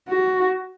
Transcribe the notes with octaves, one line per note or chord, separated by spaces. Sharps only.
F#4